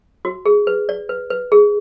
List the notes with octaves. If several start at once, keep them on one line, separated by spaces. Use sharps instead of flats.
F#4
G#4
B4
D5
B4
B4
G#4